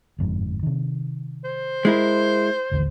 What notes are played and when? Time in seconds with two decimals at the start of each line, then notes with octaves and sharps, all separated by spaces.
0.18 G1 F2 G#2
0.63 C3 D#3
1.45 C5
1.85 G#3 E4 A#4
2.71 A1 D#2 D3